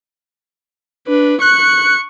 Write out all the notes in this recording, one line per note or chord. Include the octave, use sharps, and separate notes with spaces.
D4 B4
C#6 F#6 C#7